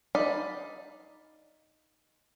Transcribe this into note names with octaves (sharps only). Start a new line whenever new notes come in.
D#4 D5 F5 B5